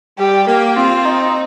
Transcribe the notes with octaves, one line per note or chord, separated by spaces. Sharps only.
G3 G4
A#3 G4
C4 F4
D#4